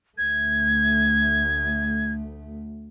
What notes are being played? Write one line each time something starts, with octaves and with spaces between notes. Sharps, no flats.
D2 A3 G#6